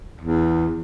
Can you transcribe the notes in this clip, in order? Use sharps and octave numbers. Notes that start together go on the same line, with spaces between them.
E2